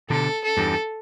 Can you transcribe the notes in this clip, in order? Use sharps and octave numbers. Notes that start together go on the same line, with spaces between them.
B2 D3 A4
A4
E2 G2